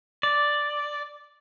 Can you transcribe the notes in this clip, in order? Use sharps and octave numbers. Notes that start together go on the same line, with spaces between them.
D5